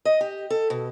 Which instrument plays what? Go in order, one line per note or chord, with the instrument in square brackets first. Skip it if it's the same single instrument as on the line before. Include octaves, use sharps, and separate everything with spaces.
[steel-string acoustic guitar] D#5
G4
A4
B2